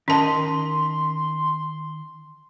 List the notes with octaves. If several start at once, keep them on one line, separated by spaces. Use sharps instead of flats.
D#3 C#4 A#4 D#5 A5 C6